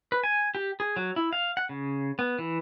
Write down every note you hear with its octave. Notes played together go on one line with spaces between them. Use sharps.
B4
G#5
G4
G#4
F#3
E4
F5
F#5
C#3
B3
E3